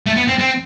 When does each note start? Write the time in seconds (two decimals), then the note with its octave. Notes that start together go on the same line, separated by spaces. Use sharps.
0.06 A3
0.17 B3
0.28 C4
0.39 C4